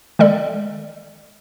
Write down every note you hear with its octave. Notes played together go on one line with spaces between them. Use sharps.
D#3 G#3 A4 D5